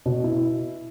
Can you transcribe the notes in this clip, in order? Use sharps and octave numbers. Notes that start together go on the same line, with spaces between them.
B2
E4